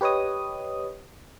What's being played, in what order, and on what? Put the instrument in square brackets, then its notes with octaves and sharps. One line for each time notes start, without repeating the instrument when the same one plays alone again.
[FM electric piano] G4 B4 C#5 D#5 D#6